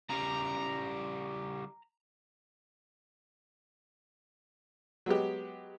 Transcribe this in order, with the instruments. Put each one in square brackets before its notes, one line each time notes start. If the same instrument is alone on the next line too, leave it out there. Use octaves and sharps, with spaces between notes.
[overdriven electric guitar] C#3 G3 [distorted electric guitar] A#5
[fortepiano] F#3 G#3 B3 G4